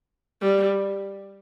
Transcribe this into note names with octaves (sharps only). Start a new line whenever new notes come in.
G3